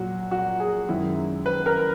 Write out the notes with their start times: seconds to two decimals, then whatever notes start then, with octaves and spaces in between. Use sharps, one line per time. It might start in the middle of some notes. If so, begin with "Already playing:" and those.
Already playing: A#2 F#3 F#4
0.31 F#4
0.60 G#4
0.89 F#2 D#3 G#3 E4
1.46 B4
1.66 A#4